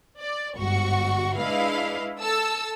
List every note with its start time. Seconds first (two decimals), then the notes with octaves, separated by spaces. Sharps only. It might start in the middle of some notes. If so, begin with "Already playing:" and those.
0.20 D5
0.57 G1 G#2 F#4 C#6
1.37 G#3 D4 E4 B4 D#5 F5
2.21 A4 A5 E6